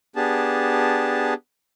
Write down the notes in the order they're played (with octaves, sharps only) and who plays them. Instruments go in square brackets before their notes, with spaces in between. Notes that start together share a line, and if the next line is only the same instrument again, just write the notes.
[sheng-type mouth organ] B3 D4 G4 G#4 A5